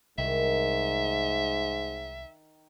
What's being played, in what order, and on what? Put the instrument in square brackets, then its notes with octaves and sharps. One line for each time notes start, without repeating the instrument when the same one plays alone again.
[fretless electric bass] C2 [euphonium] G#2 [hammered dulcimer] D#3 [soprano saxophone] E5